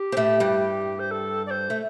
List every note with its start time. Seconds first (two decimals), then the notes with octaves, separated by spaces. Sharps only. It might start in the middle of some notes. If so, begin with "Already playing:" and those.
Already playing: G4
0.12 C4
0.17 A2 A3
0.40 G2 G3
0.99 C5
1.11 A4
1.46 D5
1.50 C5
1.70 A3